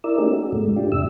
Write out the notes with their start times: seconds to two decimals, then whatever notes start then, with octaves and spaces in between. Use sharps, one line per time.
0.04 E4 A#4 D5 E6
0.18 A3 A#3 C#4 D#4 G4 G#4
0.32 F#4
0.52 G#2 B2 G#3 A3
0.76 D4 F4 G4
0.92 E2 G#2 C3 E5 E6